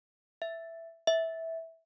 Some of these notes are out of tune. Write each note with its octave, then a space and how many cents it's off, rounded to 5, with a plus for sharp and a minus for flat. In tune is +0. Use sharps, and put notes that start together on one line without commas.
E5 +5
E5 -15